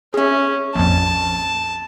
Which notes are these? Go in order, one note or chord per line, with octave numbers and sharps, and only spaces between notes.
C#4 G#4 E5
A#1 F2 A5